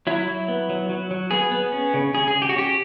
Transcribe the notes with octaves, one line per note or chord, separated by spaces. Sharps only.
F#3 E4
F#3
B3
F#3
F#3
F#3
B3 G#4
B3
C#4
C#3
C#3 G#4
G#4
C#3
G4
F#4
C#4 G4